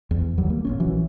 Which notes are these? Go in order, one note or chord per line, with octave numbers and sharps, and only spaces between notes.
E2
D#2 F#3 G3
A#3
A#1 E2 C#4
A#1 E3 F#3